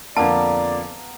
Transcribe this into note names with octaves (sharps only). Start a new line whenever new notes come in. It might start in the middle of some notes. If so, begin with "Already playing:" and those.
F2 D3 A#3 B3 D5 F5 A5 A#5